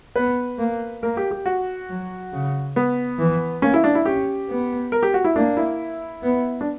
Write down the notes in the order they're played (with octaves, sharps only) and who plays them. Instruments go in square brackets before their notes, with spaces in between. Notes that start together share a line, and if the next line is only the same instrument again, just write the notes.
[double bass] B3 [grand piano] B4
[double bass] A#3
[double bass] A#3 [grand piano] A#4
[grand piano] G4
G4
F#4
[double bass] F#3
C#3
[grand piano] B3
[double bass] E3
[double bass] A#3 [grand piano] C#4
[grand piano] E4
D4
E4
[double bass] C#4 [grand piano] G4
[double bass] B3
[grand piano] A#4
G4
F#4
E4
[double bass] A#3 [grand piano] D4
[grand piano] E4
[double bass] B3
[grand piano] D4